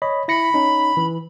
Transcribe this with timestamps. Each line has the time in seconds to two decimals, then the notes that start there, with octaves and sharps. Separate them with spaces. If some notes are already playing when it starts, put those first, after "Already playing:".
0.02 C#5 D#5 B5
0.28 E4 B5 A#6 C#7
0.54 C#4 D#4
0.97 E3